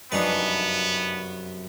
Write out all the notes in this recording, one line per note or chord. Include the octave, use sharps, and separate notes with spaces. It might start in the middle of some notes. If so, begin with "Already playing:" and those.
F1 F#2 B3 D4 D#4 B4